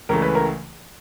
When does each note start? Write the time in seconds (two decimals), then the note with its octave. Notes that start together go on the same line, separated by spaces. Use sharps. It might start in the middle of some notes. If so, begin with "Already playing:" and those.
0.09 C#2 C#3 E3 A3 A#4
0.22 B4
0.35 A#4